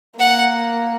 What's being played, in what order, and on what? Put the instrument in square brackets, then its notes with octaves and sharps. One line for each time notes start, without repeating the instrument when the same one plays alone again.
[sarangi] A#3 [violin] F#5